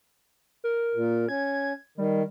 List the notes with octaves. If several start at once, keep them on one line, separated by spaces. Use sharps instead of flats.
A#4
A#2
C#4 G#6
D#3 G3